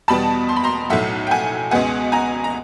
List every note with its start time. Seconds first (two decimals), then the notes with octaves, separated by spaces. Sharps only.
0.08 E2 B2 G3 B3 A5 B5
0.49 C6
0.56 B5
0.64 A#5 C6
0.90 B1 A2 F#3 E5 F#5
1.27 G5
1.31 F#5 G#5
1.71 C#2 B2 G#3 B3 F#5 G#5
2.12 G#5 A#5
2.44 A#5